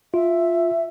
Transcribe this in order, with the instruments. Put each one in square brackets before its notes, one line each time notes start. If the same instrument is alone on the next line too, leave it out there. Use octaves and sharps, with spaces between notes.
[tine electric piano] F4 [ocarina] E5